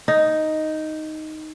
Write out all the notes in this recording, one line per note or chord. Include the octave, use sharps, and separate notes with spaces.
D#4